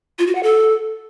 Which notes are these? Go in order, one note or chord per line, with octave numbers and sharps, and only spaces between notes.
F4
F#4
F#5
A4